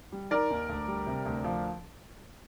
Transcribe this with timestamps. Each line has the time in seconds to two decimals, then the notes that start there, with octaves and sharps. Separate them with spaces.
0.12 G3
0.31 D#3 A#4 D5
0.50 D#2
0.69 D2
0.88 G3
1.07 C3
1.26 D2
1.44 F3